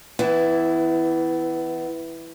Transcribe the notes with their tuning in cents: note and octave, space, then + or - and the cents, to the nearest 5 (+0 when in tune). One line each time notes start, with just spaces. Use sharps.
E3 +0 B3 +30 E4 +0